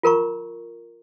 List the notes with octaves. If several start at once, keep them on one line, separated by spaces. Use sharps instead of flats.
F4 A#4 A#5 C#6